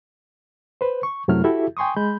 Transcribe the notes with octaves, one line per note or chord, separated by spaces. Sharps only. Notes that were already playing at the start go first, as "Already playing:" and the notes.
B4 C5
C#6
F#2 C3 F#3 A3 E4 F6
E4 F#4 G4 A4 E5
G5 G#5 C6 C#6 D#6
G#3 B5 G6